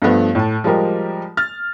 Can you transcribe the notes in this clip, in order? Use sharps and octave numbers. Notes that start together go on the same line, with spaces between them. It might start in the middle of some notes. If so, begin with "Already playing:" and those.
G2 F3 A3 B3
A2 A5
F3 G3 G#3 G4 A#4
F6 A6